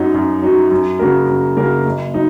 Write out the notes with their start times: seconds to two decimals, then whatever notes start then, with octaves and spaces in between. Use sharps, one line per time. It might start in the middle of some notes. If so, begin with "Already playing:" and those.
Already playing: F#2 F#3 D#4 F#4
0.14 F#2
0.42 F#3 D#4 F#4
0.71 F#2
0.99 C#3 A#3 F#4 A#4
1.29 F#2
1.57 C#3 A#3 F#4 A#4
1.85 F#1
2.14 F#3 D#4